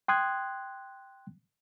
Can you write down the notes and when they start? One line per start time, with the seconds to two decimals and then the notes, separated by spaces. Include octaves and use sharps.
0.08 G5 C6 D#6 F#6 G#6